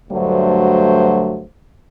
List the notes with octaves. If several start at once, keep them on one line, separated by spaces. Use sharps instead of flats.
D2 G2 F#3 A3 C5